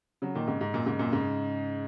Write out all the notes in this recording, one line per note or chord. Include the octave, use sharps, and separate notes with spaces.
C#3 F#3
A#2 D#3
G#2 C#3
G#2
F#2 A#2
G#2 C#3
F#2 A#2
G#2 C#3